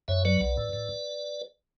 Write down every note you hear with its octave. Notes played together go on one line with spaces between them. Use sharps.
F#2 C#5 E5
F#3 B4 D5
B1
A2
A2